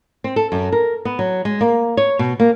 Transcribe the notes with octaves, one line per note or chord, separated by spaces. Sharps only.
C4
A4
F#2
A#4
B3
F#3
G#3
A#3
C#5
B2
A#3